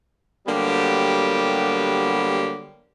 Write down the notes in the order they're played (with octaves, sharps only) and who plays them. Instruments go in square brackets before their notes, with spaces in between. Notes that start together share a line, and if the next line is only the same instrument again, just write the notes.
[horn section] D3 F#3 G3 A#3 B3 G4